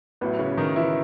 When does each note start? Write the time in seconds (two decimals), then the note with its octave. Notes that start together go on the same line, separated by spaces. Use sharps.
0.21 A1 A2 F#3 B3
0.39 C#3 C#4
0.57 D#3 D#4
0.76 E3 E4